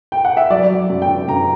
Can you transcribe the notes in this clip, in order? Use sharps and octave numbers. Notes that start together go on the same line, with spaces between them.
G5
F#5
E5
F#3 D5
F#3
F#2
G5
D3
F#2 A#5